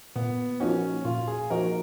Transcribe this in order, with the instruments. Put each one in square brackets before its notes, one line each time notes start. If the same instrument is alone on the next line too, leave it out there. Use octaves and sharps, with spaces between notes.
[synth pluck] A#2 [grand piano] B3
[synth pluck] F3 A#3 D#4 F#4 [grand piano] C#4
[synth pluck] A#2 [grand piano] F4
[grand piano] G#4
[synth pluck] F3 A#3 D#4 F#4 [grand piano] A#4